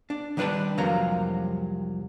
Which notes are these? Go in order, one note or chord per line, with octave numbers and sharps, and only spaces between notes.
D4
D#3 G3 D4 B4 D5 A5
C2 F2 C3 F#3 A#3 A#5